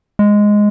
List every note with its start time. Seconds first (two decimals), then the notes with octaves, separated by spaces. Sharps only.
0.19 G#3